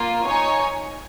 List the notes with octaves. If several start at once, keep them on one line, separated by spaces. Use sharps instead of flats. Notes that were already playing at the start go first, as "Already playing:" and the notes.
Already playing: A#3 F4
D#4 C#5 G#5